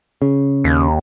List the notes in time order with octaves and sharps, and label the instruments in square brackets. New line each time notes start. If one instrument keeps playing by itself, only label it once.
[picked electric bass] C#3
[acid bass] D#2